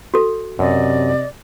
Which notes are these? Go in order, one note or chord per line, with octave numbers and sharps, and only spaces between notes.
F#4 A4
F#2 C3 D5 D#5